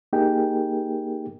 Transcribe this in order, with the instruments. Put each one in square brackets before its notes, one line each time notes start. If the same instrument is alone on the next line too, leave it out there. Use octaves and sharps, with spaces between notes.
[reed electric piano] A#3 D#4 G4 G#4 A#4 G5